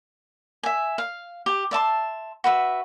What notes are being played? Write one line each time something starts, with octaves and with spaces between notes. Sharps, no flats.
E5 G#5
F5
G4
D5 E5 A5 C6
F#4 B4 E5